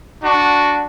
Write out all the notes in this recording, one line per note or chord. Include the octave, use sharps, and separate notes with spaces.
D4 F#4